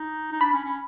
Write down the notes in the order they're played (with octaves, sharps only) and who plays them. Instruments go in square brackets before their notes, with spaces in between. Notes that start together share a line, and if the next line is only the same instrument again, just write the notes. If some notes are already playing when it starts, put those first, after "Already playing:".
Already playing: [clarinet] D#4
D#4
[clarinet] D4 [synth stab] B5
[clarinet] C#4
C#4